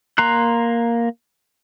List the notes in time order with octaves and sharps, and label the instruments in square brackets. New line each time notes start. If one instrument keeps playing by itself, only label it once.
[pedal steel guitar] A#3 A#5 C6 F#6